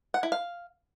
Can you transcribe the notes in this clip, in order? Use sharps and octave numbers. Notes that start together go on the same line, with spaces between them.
F#5
E4
F5